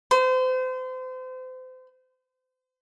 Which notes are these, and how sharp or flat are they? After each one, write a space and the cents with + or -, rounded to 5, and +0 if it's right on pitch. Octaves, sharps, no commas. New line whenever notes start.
C5 -35